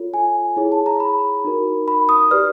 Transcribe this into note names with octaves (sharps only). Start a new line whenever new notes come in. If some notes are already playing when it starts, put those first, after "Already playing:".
Already playing: F4 A4 C#5
G#5
E4 G#4 C#5
A5
A#5
B5
D#4 F#4 A#4
B5
D#6
G4 B4 D5 F6